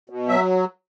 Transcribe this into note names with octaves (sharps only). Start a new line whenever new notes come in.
B2
F#3 E5